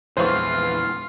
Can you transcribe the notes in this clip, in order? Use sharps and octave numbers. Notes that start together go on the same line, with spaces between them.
A#1 E2 E3 G#3 F4 C5 F5 C#6